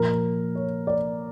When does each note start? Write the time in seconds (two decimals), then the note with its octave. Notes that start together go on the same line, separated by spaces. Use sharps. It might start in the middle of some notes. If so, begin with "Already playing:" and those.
Already playing: A#2 F3 A#4
0.55 C#5
0.87 D5